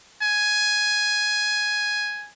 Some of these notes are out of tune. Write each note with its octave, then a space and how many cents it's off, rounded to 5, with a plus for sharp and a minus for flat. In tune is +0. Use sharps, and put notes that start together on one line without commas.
G#5 +5